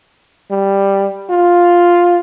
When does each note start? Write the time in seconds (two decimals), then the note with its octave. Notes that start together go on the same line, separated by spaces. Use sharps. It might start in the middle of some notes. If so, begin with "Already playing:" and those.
0.51 G3
1.30 F4